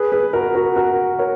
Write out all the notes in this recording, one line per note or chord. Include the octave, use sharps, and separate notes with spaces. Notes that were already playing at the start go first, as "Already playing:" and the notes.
Already playing: G#4 B4
G#4 B4
F#4 A#4
F#4 A#4
F#4 A#4
A#4 C#5